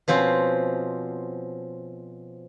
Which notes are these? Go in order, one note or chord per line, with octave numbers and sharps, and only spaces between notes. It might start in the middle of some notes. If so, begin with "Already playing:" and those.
B2 F3 C4 C#4